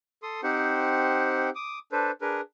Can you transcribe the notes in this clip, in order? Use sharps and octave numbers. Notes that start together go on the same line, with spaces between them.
A4 C6 D#6
C4 D#4 G4 C5 F#5
D6 D#6
D4 A4 B4 C5
D4 G#4 A#4 B4